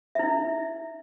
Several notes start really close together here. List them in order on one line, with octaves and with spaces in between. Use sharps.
E5 E4 D#4